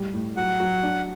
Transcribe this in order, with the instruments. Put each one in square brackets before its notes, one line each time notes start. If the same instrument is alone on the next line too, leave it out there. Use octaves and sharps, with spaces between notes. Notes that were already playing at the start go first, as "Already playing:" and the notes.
Already playing: [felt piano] A2 G3
A2
[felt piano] F#3 [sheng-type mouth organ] F#5
[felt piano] F#3
D4